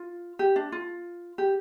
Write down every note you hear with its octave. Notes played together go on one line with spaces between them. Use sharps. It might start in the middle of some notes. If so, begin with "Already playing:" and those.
Already playing: F4
G4
D4
F4
G4